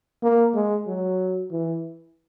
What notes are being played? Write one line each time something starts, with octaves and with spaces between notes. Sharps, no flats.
A#3
G#3
F#3
E3